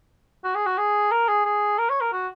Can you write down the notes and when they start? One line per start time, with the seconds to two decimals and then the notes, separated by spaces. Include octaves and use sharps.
0.44 F#4
0.55 G#4
0.66 F#4
0.78 G#4
1.11 A#4
1.28 G#4
1.45 G#4
1.78 A#4
1.90 C#5
2.01 A#4
2.13 F#4